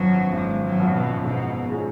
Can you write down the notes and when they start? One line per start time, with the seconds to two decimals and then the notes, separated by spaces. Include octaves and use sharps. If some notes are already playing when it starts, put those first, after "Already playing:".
Already playing: G#1 F#2 F3 F#3 B3 F#4
0.33 G#1 G#3
0.63 F#3
0.79 F#2 F3 B3 F#4
0.94 B2
1.24 G#2 B2
1.70 G#3 C#4 F4 G#4